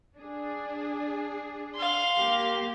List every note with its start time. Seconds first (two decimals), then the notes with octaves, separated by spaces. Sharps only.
0.17 D4 G#4
1.75 F5 C6
2.17 A#3 G4